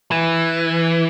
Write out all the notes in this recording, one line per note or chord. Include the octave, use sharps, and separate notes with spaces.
E3